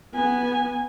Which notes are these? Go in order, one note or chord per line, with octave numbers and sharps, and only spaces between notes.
B3 G#5